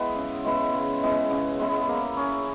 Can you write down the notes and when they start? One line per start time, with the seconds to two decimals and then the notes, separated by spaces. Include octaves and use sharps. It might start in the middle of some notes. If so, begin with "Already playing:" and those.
Already playing: G#3 B3 E4
0.16 C#3
0.45 G#3 B3 E4
0.74 C#3
1.02 G#3 B3 E4
1.31 C#3
1.60 G#3 B3 E4
1.88 A#3
2.17 C#4 G#4